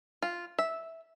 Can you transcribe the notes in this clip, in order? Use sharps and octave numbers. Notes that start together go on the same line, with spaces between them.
F4
E5